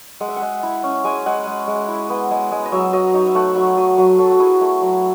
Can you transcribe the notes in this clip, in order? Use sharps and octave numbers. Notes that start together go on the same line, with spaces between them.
G#3 F#5
E5
F#5
G#3
E4
C#4
G#3 G#5
G#3 F#5
G#3
G#3
E4
B3
G#3
G#3
D#5
F#3 E5
F#3 D#5
D#4 C#5
E5
A3 F#5
F#3 E5
F#3 D#5
F#3 C#5
F#3 A4
F#4
E4 G#4
A3
F#3